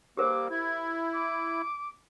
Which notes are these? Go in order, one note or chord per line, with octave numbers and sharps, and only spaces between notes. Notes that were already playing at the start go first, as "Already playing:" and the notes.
G3 A#3 G4 A#4 C5 D6
E4 G#6
D6